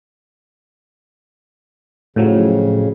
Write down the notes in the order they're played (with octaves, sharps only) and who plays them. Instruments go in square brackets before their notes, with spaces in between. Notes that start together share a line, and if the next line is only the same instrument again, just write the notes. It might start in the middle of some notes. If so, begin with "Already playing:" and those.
[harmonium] F2 C#3 [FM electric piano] A2 F3 F#3